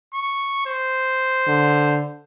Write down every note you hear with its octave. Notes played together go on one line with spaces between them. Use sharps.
C#6
C5
D3